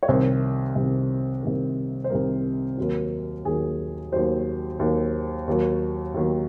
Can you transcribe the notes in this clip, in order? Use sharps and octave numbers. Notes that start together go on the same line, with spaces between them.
C#5
C2 C3 D#3 C5
C2 C3 D#3
C2 C3 D#3
C5
C2 C3 D#3 A#4
D#2 D#3 F#3
D#2 D#3 F#3 G#4
D#2 D#3 F#3 C5
D#2 D#3 F#3
D#2 D#3 F#3
D#2 D#3 F#3